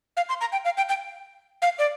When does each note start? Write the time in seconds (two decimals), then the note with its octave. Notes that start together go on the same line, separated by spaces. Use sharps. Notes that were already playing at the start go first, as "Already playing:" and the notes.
0.17 F5
0.29 C6
0.41 A#5
0.52 G5
0.65 F5
0.77 G5
0.89 G5
1.62 F5
1.79 D5